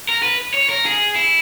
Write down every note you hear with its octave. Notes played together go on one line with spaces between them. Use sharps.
A#4
B4
C#5
A#4
G#4
E4